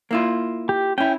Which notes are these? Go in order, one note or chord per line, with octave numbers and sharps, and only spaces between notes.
A#3 E4 F4
G4
C#4 E4 G5